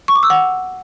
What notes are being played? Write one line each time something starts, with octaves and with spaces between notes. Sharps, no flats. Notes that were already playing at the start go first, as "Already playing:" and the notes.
C#6
D6
E6
F#5